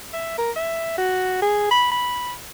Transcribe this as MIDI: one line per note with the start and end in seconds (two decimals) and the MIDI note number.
0.13 0.34 76
0.38 0.51 70
0.56 0.93 76
0.98 1.40 66
1.42 1.68 68
1.71 1.87 83
1.92 2.34 83